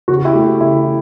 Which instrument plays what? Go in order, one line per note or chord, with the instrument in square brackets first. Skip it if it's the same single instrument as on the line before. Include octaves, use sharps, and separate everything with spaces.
[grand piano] C#3 F#4
E4 G4
A3
C#3 E4